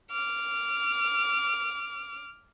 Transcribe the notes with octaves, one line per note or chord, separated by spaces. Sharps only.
D6 F6